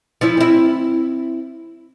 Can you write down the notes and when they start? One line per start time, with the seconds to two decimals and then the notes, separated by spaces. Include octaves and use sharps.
0.21 F3 C#4 E4
0.37 C4 E4